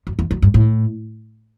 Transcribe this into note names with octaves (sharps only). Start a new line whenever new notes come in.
F#2
E2
F#2
G2
A2